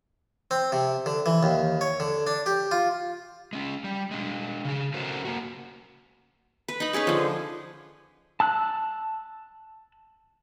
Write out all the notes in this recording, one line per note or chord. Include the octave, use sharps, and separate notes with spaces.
C4
C3
D3
E3
D#2
C#5
D3
D4
G4
F4
G#3 C#4
G3
G#3 D4
C#3 G#4
F#3 A3 C#4 F#4 A#4 C5
A#3 F#4
B4
D#4 B5
C#4 D#4 G#4 B4
D3 F3
A5 E6 F#6